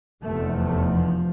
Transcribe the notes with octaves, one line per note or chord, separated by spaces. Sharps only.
F1 E2 C3 A3
A3
F3